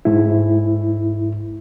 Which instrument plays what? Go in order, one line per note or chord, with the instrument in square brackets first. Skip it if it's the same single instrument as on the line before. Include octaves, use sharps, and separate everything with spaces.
[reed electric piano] G#2 E4